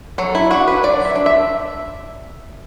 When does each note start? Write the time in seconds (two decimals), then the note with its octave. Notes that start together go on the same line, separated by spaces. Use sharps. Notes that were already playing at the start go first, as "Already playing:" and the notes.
0.18 F#3 A4
0.35 E4
0.50 D4 F#4
0.67 B4
0.83 F#3 D5
1.05 E5
1.16 D4
1.26 E5